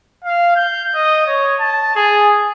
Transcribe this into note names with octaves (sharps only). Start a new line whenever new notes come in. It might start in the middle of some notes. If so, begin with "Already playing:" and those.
F5
G6
D#5
C#5
A5
G#4